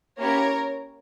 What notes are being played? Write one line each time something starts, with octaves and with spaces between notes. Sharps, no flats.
A#3 C#4 E4 G4 A#4 C#5